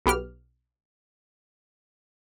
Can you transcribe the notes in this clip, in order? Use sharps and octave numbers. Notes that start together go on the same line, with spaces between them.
B1 B3 G4 F6